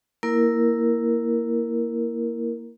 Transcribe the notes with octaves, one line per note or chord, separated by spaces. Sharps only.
A#3 E4 A#4